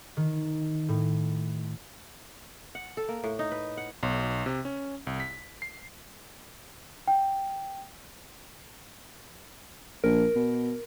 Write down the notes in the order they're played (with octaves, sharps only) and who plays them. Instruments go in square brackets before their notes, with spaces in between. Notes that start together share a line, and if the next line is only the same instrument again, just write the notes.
[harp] D#3
A2
[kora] F#5
A4
A#3
A2
D#4
B4
F#5
[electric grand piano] B1
C3
C#4
C2
B6
C7
[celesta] G5
[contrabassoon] A#1 [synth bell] A#4
[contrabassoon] B2